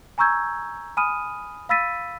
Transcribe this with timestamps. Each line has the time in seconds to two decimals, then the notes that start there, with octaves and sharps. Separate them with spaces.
0.18 G#5 A#5 C#6 E6 G6 G#6
0.97 G#5 B5 D#6 F6 D#7
1.69 F5 B5 E6 A6 B6 D#7